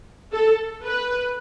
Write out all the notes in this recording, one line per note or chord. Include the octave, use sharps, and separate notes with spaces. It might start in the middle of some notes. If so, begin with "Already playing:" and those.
A4
B4